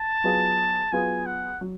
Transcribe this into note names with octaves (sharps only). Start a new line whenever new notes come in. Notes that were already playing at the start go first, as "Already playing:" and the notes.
Already playing: A5
F#3 B3 F4 G#4
F#3 B3 F4 G#4 G#5
F#5
F#3